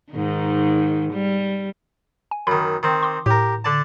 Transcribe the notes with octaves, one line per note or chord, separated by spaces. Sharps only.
G#2 D#3
G3
G#5
F#2 D#3 B5
D#3 C4
C6 D6 D#6
A2 G4 A#4
D3 D5 A5